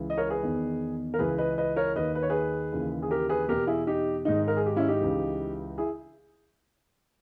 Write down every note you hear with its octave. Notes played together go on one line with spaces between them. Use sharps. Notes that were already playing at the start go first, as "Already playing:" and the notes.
Already playing: C#2 C#3 E3
D#5
A#4 C#5
G#4 B4
E2 D#3
A#4
C#2 C#3 E3 G#4 B4
B4 D#5
B4 D#5
A#4 C#5
D#2 D#3 B4 D#5
B4
C#5
G#4 B4
D#2 C#3 E3
G#4
G4 A#4
G#4 B4
E2 B2 G4 A#4
E4 G#4
D#4 G4
G#2 D#3 D#4
A#4
G#4
G4
C#4 E4
D#4 G4
C#2 C#3 E3
E4 G#4